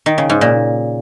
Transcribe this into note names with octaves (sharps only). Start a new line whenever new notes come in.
D#3
C#3
G#2
A#2